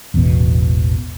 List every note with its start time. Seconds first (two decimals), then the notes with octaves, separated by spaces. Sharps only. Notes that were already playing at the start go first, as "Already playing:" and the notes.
0.14 E1 A1 E2 B2